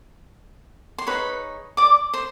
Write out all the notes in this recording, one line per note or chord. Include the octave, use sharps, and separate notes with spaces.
C6
D#4 G#4 B4 C#5 B5
D5 D6
C5 C6